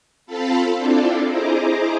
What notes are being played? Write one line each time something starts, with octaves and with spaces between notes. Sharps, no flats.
C4 F4 A4 F5 A5 B5
C4 D4 E4 F4 A4 D5
E4 G#4 C5 D#5 A#5 D6